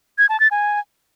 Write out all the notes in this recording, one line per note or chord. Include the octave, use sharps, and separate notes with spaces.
G#6
A5
A6
G#5